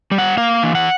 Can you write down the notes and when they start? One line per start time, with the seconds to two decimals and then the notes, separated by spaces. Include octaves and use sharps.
0.11 G3
0.18 F#5
0.37 A#3 F5
0.63 E3
0.75 F#5